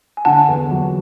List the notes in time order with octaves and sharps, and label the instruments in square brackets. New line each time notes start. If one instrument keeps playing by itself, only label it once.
[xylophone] G#5
[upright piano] D3 [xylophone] F#5 A5
[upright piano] E2
F#3